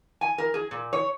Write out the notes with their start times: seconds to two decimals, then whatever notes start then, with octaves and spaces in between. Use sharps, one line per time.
0.21 G#5
0.38 A#4
0.54 G#4
0.71 A#2
0.93 C#5